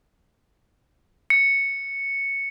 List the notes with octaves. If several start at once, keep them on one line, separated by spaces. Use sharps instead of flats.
C#7